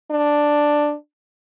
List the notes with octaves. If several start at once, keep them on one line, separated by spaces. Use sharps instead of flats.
D4